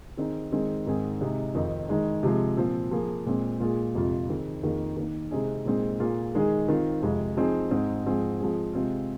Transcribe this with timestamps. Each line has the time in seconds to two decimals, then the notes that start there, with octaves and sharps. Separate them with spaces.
0.17 D#3 C4 D#4 G#4
0.52 D#3 G#3 C4 D#4 G#4
0.86 G#2 D#3 C4 G#4
1.20 C3 G#3 D#4 G#4
1.54 F2 D#3 C4 D#4
1.89 D#3 G#3 D#4
2.23 C3 F3 G#3
2.57 A#2 F3 C4
2.91 F3 A#3 G#4
3.26 A#2 G#3 C4
3.60 A#2 G#3 F4 G#4
3.95 F2 C3 G#3 F4
4.29 D#3 C4 G#4
4.62 F2 D#3 A#3 G#4
4.97 D#3 A#3 D#4
5.31 C3 G#3 C4 D#4 G#4
5.65 A#2 G#3 C4 D#4 G#4
6.00 A#2 A#3 F4 G#4
6.35 D#3 G#3 D#4 G#4
6.68 D#3 C4 F4
7.02 F2 C3 G#3
7.37 F3 C4 D#4 G#4
7.71 G#2 G#3 C4 D#4 G#4
8.05 G#2 F3 G#3 C4 G#4
8.39 F3 G#3 C4 G#4
8.73 C3 G#3 C4 F4